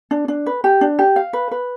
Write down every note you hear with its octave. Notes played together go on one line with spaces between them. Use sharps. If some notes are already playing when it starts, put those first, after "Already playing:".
D4
D4
B4
G4
D4
G4
F5
B4
B4